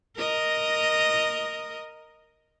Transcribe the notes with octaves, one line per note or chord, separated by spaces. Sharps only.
A#4 D#5